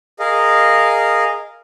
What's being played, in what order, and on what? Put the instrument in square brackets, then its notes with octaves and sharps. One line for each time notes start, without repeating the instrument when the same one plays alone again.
[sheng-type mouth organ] G#4 A#4 D#5 F5